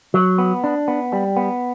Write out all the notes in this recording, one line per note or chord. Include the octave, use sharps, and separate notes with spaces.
F#3
B3
D4
B3
G3
B3